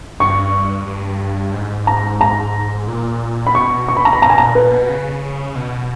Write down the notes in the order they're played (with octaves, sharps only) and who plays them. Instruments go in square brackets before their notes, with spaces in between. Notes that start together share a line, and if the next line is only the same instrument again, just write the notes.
[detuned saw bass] G2 [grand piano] C#6
[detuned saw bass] G2
G#2
[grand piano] A#5
A#5
[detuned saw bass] A#2
[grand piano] B5
[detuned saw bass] A#2
[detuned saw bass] B2 [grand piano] C#6
[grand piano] C#6
B5
A#5
B5
[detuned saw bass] B2 [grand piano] A#5
[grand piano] G#5
[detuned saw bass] A#2 [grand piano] A#5
[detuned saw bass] A#2 [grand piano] B4
[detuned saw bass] B2
C#3
B2